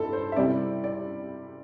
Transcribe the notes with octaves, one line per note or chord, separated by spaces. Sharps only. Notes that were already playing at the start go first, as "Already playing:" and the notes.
Already playing: G2 C4 E4 A4
C5
E5
C3 G3 C4 E4 D5
D5